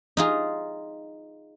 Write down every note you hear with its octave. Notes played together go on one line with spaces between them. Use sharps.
D#4 F4 G#4